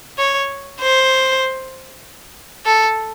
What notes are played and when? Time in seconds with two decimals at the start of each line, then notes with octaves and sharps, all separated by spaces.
0.19 C#5
0.80 C5
2.65 A4